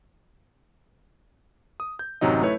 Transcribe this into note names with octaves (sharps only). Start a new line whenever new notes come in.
D#6
G6
A1 F#2 C3 F#3 D#4 D#5
A3 E4 B4 C#5